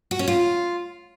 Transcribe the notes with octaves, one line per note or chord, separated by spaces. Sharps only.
F#4
C#4
F4